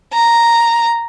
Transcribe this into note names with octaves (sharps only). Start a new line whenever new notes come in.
A#5